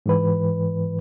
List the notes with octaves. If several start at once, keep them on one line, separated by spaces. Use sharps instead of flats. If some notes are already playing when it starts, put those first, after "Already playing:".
G#2 E3 B4